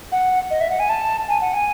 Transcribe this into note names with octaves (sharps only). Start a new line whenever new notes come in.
F#5
D#5
E5
F#5
G#5
A5
G#5
F#5
G#5